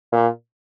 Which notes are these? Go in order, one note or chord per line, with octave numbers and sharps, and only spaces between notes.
A#2